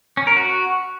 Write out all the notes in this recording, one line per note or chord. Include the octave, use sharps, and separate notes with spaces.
C#4
A#4
F#4